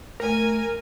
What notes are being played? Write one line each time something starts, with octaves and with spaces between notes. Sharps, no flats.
A3 A#4 G#5